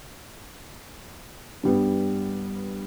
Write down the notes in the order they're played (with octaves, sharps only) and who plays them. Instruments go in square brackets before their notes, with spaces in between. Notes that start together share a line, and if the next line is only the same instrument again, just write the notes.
[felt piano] G2 G3 B3